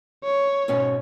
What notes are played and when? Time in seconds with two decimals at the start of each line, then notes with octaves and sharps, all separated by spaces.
0.24 C#5
0.68 G#2 B2 C#4